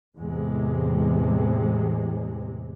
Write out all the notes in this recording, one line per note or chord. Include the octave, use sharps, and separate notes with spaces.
E2 A2 C3 G#3